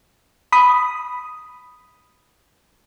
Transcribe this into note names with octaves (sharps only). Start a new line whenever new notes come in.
B5 D#6